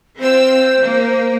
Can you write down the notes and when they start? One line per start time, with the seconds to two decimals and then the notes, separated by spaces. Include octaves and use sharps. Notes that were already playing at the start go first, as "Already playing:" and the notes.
0.19 C4 F4 C5 E6
0.80 A#3